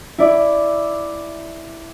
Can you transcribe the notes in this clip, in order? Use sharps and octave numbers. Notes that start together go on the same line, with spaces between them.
E4 D5